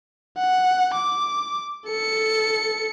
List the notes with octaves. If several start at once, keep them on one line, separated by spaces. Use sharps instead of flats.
F#5
D6
A4 C#7